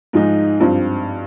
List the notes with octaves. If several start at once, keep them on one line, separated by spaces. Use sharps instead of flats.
G#2 F3 G#3 D#4
G2 F3 C4 F4